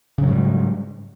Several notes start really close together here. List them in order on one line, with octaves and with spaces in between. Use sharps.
C#3 F#3 G#2 G3